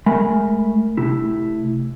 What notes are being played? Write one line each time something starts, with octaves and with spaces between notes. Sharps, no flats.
G#3 A3 A#4 G#5 B5
C3 A3 E4